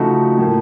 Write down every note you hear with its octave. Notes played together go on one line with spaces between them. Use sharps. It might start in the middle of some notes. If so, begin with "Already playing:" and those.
Already playing: C#3 F3 A3 D#4 F#4
A2 F3 A#3